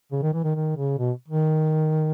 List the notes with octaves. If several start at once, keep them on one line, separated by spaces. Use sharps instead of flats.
C#3
D#3
E3
D#3
D#3
C#3
B2
D#3